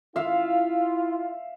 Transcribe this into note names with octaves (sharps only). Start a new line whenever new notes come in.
E4 F4 E5 F5